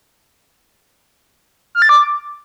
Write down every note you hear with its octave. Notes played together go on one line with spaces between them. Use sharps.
F6
A6
D6